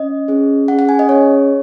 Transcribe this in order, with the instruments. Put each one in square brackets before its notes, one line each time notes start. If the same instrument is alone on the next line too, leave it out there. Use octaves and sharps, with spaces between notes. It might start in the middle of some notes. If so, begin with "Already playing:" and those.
Already playing: [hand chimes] C#4 D#5
C#4 G#4
C#4 G#4 F#5
F#5
G#5
D#5
C#4 G#4 C#5